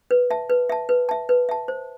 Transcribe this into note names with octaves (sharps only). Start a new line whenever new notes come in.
B4
E5 A5
B4
E5 A5
B4
E5 A5
B4
E5 A5
C5